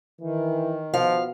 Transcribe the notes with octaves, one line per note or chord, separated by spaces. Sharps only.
D#3 E3
B2 F3 F5